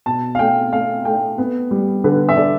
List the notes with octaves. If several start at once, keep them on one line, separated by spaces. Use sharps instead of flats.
B2 A5
F5
A3 G5
A3 F5
A3 G5
B3
G3
D3 B4
E5
D3 D5